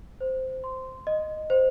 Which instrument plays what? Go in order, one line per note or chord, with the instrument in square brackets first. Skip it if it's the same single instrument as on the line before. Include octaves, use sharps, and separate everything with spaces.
[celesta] C5
C6
D#5
C5